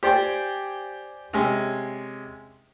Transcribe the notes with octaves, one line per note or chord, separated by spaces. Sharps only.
G4 C5 D5 G5 G#5
C3 G#3 C#4